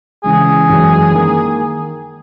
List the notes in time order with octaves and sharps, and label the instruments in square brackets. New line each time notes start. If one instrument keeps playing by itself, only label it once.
[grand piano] C#3 E3 G#3 [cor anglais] G#4
[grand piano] F#2 E3 G#3
D#3 A#3